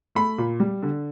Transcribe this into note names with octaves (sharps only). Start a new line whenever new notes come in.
A3 B5
A#2
G3
D3